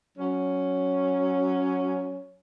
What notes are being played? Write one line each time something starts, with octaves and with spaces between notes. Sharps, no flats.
F#3 C#4